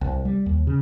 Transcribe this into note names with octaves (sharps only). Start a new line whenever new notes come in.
C2
G3
D#2
C#3